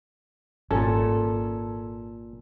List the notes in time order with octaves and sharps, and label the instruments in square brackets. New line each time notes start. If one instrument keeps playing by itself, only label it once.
[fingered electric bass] G#1 [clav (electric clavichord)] A#2 C#4 [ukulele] A4